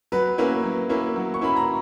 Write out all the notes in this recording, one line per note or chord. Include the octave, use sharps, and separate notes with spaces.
F#3 B4
A#3 C#4 E4 B4
F#3
A#3 C#4 E4
F#3
C#6
A#3 C#4 E4 B5
A#5